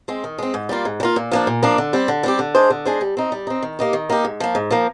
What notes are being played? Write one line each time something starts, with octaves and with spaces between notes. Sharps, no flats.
G#3 C4
D#3
G#3 C4
G#2
G3 A#3 F4
G#2
G3
A#3 F4
A#2
F3 A#3 D4
A#2
F3 A#3 D4
D3
G3 C4 G4
D3
G3 C4 G4
D3
G#3 D4 G#4 C5
D3
G#3 D4 G#4 C5
G3
C4 D#4
G3
C4 D#4
D#3
A#3 D#4 G4
D#3
A#3 D#4 G4
G#2
F3 A#3
G#2
F3 A#3